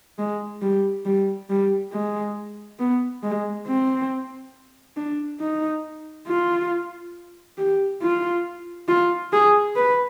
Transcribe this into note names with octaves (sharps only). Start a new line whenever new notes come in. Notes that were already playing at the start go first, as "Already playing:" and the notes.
G#3
G3
G3
G3
G#3
B3
G#3
C4
D4
D#4
F4
G4
F4
F4
G#4
B4